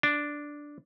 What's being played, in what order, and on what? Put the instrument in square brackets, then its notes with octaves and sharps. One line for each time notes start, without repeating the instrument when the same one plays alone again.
[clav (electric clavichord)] D4